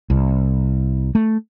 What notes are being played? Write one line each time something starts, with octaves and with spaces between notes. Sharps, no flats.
C2
A3